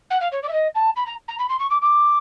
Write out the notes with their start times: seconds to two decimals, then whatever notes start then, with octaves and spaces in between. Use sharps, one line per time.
0.10 F#5
0.20 F5
0.31 C#5
0.42 D5
0.48 E5
0.52 D#5
0.74 A5
0.96 B5
1.06 A#5
1.28 A#5
1.38 B5
1.49 C6
1.59 C#6
1.70 D6
1.81 D6